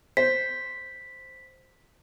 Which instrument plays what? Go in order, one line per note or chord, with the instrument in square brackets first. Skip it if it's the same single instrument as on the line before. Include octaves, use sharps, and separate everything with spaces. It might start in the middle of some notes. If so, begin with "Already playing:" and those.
[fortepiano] C5 [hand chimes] B6